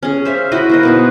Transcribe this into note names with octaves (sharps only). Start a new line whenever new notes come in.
C#4 G#4
C5 E5 F5
E4 F#4 D#5 B5
A#3 C5 D#5
B2 D#4 C5